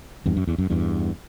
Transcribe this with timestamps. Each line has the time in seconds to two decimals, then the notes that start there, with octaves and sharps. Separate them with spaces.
0.26 E2 G2
0.37 F#2
0.47 E2
0.58 F#2
0.70 E2 G2